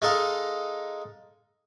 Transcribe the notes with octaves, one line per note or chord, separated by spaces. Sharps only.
G#3 D#4 A4 F5